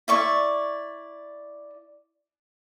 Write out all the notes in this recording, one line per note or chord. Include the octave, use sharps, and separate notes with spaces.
E4 D5 C#6